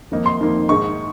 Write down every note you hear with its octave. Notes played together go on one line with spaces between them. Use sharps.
F2 D#3 A#3 D#4
C6
F2 D#3 A#3 D#4
G#2 D#3 G#3 D#4 C#6